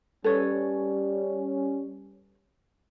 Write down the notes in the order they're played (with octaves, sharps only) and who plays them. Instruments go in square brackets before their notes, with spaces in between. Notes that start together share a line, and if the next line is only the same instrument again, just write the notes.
[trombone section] G3 C#4 [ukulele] A4 B4 C#5